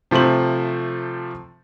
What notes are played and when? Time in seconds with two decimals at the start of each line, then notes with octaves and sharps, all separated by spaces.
0.11 C3 F3 A3 C5 F#7